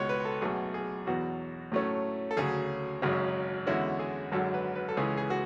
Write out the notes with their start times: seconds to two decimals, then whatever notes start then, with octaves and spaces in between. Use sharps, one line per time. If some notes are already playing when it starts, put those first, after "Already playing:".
Already playing: C#2 B2 G#3 C#5
0.09 B4
0.25 A4
0.42 B1 B2 A3 G#4
0.74 G#4
1.07 E2 B2 F#3 F#4
1.72 A2 F#3 A3 C#4
2.31 A4
2.37 D2 C#3 F#3 G#4
3.02 G#1 F#2 C#3 F#3
3.67 E2 D3 G#3 C#4 E4 F#4
3.99 G#4
4.32 G#1 F#2 D3 F#3 A4
4.54 B4
4.75 B4
4.89 A4
4.97 C#2 C#3 E3 G#4
5.17 G#4
5.30 F#4